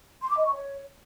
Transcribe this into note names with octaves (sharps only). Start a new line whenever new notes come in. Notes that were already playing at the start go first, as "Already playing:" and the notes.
C6
D6
D#5
C#6
C#5